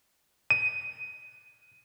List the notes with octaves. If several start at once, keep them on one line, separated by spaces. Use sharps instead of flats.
D#7